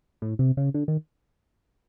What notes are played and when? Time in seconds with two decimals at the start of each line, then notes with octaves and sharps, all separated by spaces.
0.22 A2
0.39 C3
0.57 C#3
0.74 D3
0.88 D#3